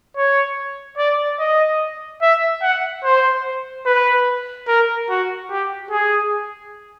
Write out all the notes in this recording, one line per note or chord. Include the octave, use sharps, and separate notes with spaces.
C#5
D5
D#5
E5
F#5
C5
B4
A#4
F#4
G4
G#4